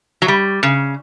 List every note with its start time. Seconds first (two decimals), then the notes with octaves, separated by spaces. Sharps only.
0.22 F#3
0.28 G3
0.63 C#3